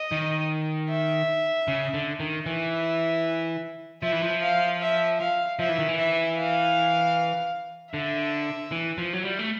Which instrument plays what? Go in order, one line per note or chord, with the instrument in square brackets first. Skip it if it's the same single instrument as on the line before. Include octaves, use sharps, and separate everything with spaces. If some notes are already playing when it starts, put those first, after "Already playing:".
Already playing: [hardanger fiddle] D#5
[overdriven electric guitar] D#3
[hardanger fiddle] E5
[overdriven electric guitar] C#3
D3
D#3
[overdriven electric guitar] E3 [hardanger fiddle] E5
[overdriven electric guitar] F3 [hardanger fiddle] E5
[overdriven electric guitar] E3
F3
[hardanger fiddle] F5
E5
F5
[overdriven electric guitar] F3 [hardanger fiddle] E5
[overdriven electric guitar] E3
D#3
E3
[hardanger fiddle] E5
F5
[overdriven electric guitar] D3 [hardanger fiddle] E5
[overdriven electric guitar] E3
F3
F#3
G3
A3